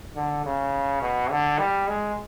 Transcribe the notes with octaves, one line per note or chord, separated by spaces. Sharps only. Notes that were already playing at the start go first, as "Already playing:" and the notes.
D3
C#3
B2
D3
G3
G#3